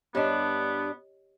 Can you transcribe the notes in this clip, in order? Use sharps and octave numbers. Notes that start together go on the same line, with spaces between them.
G2 B3 D4 G4 C#5 D#5